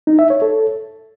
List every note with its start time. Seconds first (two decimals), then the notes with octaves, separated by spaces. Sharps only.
0.07 D#4
0.19 E5
0.30 C#5
0.42 A4